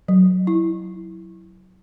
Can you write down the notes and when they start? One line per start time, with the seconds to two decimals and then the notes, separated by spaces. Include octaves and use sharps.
0.08 F#3
0.47 E4